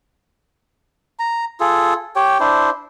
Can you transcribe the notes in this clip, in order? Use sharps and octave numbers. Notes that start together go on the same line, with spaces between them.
A#5
F4 G#4 A4
G4 C#5 G5
D4 E4 C5